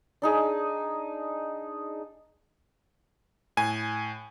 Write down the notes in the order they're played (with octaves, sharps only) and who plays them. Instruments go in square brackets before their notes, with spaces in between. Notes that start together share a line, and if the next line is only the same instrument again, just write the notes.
[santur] D4 D#4 G#4
[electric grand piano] A2 G#5